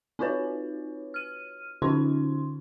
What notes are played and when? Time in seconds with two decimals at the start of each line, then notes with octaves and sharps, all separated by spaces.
0.19 C4 D#4 F4 F#4 B4 C#5
1.14 F6 D#7
1.82 D3 C#4 D#4 F4 C5 C6